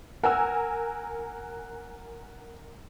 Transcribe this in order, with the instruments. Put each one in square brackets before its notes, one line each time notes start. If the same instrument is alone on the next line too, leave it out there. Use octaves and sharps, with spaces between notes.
[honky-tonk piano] A#4 G#5 E6 [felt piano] F#5